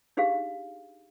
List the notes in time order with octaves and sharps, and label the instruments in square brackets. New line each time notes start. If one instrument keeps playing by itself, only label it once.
[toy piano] D4 D#4 G4 G#4 F5